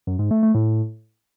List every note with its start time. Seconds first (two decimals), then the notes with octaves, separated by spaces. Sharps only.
0.07 F#2
0.19 G#2
0.31 A3
0.43 A3
0.55 A2